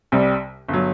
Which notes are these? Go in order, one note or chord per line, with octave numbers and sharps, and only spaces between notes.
C2 C3 G3
G1
F#3